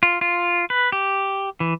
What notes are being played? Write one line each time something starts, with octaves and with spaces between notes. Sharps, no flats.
F4
F4
B4
G4
E3